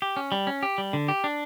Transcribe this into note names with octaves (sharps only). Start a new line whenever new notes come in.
G4
C#4
G3
C#4
G4
G3
D3
G4
D4